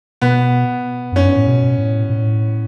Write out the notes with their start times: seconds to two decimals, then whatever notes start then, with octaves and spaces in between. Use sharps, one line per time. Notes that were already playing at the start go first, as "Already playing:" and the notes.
0.21 B2 B3
1.12 F#2 C#4
1.24 G2
1.35 A2
1.47 B2
1.78 A2
2.10 A2